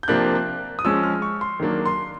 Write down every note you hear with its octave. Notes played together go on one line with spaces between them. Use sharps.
G6
C3 F3 A#3 D4 F#6
D#6
F3 G#3 C#4 E6
F6
C#6
C6
D#3 F#3 A#3 D4
C6